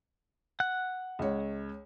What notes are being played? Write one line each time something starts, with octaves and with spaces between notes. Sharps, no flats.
F#5 F#6
C#2 C#5